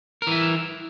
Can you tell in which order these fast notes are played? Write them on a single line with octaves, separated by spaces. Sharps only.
A#4 E3 E4